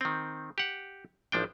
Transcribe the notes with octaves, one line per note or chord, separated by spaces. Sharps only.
D#3 C4
G4 F#5
A1 F3 D4 G5